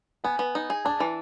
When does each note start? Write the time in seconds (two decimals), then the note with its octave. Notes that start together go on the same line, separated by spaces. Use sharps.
0.24 B3 G#5
0.39 B3
0.55 D#4
0.70 G#4
0.85 D4 A5
1.00 E3